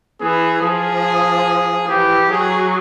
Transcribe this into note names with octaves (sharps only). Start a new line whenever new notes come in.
E3 G#4
F3 G#4
E3 G4
F#3 G#4